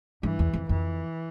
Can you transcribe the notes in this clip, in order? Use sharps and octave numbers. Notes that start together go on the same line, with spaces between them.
G2 E3
E2
F2
F2 E3